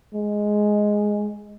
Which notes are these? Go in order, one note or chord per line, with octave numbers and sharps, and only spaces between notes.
G#3